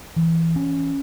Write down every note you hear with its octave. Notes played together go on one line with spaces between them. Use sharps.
E3
C#4